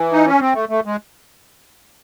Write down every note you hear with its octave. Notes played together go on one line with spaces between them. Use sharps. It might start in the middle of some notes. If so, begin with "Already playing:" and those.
Already playing: E3
D#4
C#4
C4
A3
A3
G#3